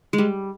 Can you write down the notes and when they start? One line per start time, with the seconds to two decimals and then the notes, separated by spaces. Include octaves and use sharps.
0.13 G#3
0.18 G3